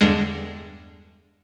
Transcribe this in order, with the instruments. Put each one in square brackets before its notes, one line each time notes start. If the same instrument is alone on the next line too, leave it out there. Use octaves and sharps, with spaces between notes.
[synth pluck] E2 G2 D3 G3 G#3